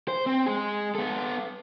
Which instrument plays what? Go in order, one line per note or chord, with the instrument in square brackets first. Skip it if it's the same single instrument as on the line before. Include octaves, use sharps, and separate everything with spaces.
[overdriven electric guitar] C5
C4
G#3 G#4
B3 A4